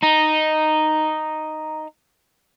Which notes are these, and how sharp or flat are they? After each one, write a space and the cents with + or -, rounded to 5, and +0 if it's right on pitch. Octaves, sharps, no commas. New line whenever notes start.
D#4 -5